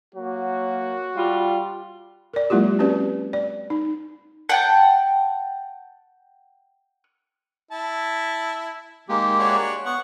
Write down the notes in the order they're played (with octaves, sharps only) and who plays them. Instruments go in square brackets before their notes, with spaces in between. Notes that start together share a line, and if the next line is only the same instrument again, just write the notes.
[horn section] F#3 A#3 [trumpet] F#4
[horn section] G3 F4
[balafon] A#4 D5
F#3 G#3 A#3 E4 F4 G4
C4 C#4 F#4 G4 B4 D5
D5
D#4
[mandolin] F#5 G5 A5
[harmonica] E4 A5
[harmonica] D#3 [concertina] G#3 A#3 G4
[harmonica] D4 F#4 C#5
[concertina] B3 [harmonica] F#5 C#6